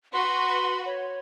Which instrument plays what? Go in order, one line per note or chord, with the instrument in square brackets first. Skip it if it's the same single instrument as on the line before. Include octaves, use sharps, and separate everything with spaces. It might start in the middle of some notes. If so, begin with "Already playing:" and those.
[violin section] F#4 B4 [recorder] C6
[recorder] C#5